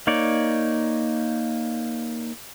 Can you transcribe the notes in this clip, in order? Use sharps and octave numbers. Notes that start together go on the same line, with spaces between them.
A#3 D#4 C#5 D5